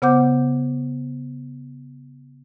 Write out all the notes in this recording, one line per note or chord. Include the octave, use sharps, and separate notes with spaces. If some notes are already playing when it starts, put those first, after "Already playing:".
C#3 B3 C5 F#5 D6 G6